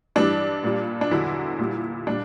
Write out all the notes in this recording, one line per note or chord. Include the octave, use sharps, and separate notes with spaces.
G2 E3 G3 D4
A#2 G3
D4
E2 D3 F#3 E4
A#2 G3
A#2 G3 D4